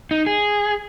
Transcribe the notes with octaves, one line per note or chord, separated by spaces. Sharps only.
D#4
G#4